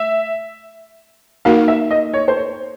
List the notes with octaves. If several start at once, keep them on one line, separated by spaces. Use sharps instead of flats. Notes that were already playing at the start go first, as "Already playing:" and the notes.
Already playing: A3 E5
A#3 D#4 F#4 A#4 F5
E5
D#5
C#5
C5
C#5